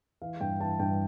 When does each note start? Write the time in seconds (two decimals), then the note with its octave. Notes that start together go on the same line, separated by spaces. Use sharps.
0.22 E3 F5
0.41 G2 G5
0.60 E3 A5
0.79 G2 G5